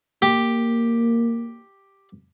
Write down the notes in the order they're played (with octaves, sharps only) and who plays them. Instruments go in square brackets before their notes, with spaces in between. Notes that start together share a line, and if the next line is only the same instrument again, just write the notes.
[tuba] A#3 [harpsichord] G4